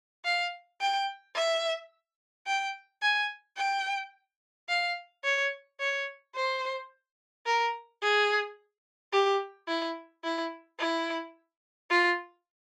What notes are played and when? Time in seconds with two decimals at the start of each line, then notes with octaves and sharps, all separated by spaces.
0.25 F5
0.81 G5
1.35 E5
2.47 G5
3.02 G#5
3.57 G5
4.69 F5
5.24 C#5
5.80 C#5
6.35 C5
7.46 A#4
8.02 G#4
9.13 G4
9.68 E4
10.24 E4
10.79 E4
11.90 F4